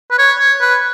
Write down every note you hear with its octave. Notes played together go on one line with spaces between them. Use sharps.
B4
C#5
C#5
B4